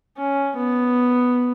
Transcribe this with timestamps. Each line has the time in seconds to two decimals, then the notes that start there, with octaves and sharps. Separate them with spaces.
0.18 C#4
0.57 B3